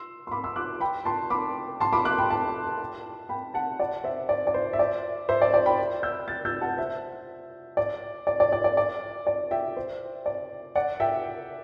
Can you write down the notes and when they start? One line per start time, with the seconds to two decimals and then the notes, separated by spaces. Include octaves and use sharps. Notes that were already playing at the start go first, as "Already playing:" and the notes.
Already playing: C6 E6
0.27 C6
0.31 B5 D6
0.44 C6 E6
0.56 D6 F#6
0.81 G5 B5
1.05 A5 C6
1.30 B5 D6
1.80 A5 C6
1.93 B5 D6
2.05 D6 F#6
2.18 G5 B5
2.30 A5 C6
3.29 G5 B5
3.54 F#5 A5
3.80 D5 F#5
4.04 C5 E5
4.29 D5
4.47 D5
4.54 C5
4.73 E5
4.79 D5
5.29 C5 E5
5.42 D5
5.54 D5
5.66 G5 B5
6.03 E6 G6
6.28 F#6 A6
6.45 E6 G6
6.61 F#5 A5
6.77 C5 E5
7.77 D5
8.27 D5
8.40 D5
8.52 D5
8.64 D5
8.77 D5
9.27 D5
9.51 E5 G5
9.77 C5
10.26 D5
10.75 D5 F#5
11.00 E5 G5